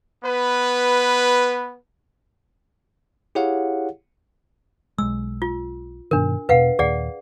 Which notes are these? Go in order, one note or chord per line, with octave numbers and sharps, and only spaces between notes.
B3 B4
E4 G4 G#4 C#5 F5 F#5
B1 G#3 E6
F4
G2 B2 D#3 D4 A#4
E1 B2 B4 F5 F#5
D#2 A#2 G#4 D5 F#5